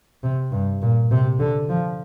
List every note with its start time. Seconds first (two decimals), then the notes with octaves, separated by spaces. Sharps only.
0.23 C3
0.52 G2
0.82 A#2
1.11 C3
1.40 D3
1.69 F3